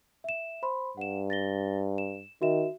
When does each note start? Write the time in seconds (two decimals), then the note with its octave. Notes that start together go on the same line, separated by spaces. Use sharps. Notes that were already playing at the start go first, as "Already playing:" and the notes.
0.24 E5 E7
0.63 C5 B5 C6
0.97 G2 F#5 E7
1.30 A6 A#6 G7
1.98 E7
2.42 D#3 F#4 E5 E7